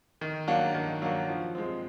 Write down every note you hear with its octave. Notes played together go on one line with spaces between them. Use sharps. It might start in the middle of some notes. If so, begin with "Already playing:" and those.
D#3
F#3 A#3 D4 F#4
D#3
F#3 A#3 D4 F#4
F3
G#3 C4